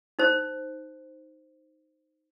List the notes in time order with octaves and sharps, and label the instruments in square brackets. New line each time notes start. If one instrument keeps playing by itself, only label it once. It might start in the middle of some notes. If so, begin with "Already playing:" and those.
[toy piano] D#4 C5